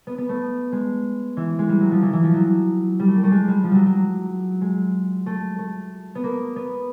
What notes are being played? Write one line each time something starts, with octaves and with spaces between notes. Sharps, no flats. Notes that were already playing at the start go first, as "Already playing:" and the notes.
B3
B3
A3
G#3
E3
G#3
G3
F#3
F3
E3
E3
F3
F#3
G3
A3
A#3
A3
G#3
G3
F3
F#3 G3
F#3
G#3
A3
A3
B3
A#3
B3